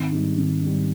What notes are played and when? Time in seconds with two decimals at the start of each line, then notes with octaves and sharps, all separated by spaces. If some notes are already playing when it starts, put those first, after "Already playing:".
Already playing: G#1
0.12 G#2 G3
0.38 G#1
0.63 G#2 G3